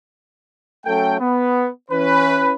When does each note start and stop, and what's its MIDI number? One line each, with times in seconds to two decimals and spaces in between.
0.85 1.16 54
0.85 1.16 57
0.85 1.16 61
0.85 1.16 69
0.85 1.16 79
1.20 1.68 59
1.91 2.54 52
1.91 2.54 61
1.91 2.54 71